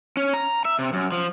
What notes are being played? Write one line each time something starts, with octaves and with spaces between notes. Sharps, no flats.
C#4
A#5
E5
C3
F#2
F3